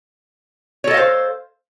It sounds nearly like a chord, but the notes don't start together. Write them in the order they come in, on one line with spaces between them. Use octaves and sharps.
C#5 A4 D#5 F5 C5